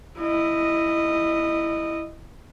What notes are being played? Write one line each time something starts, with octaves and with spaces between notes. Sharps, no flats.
E4 D#5